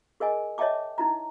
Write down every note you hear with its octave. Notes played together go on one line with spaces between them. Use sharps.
G#4 A#4 D#5 G#5
C#5 D#5 E5 G5 A5 D6
D#4 E4 A#5